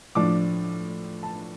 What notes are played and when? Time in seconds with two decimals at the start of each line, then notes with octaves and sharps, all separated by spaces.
0.15 A2 F3 D4 D6
1.23 A5